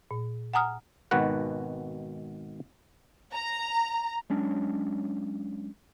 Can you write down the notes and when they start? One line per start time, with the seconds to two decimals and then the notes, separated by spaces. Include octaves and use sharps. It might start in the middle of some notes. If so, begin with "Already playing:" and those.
0.11 A#2
0.54 F#5 G#5 A#5 D#6 F6
1.11 G#1 B2 D#3 F#4 B4 F#5
3.32 A#5
4.30 F#3 G#3 C#4 D4